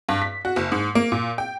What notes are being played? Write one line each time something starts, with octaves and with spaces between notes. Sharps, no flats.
G2
B6
F#4
F#1
G#2
A#3
A#2
G5